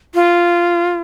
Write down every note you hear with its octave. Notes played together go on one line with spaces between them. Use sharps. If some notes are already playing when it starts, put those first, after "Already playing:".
F4